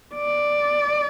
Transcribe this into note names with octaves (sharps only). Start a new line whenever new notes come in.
D5